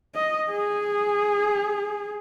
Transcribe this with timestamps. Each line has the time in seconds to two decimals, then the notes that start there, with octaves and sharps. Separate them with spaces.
0.15 D#5
0.51 G#4